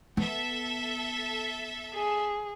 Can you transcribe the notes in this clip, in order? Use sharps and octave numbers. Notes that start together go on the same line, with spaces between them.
B3 A4 E5
G#4